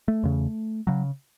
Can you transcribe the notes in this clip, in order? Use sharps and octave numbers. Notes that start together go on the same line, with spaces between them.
A3
E2 C#3
C#3 F#3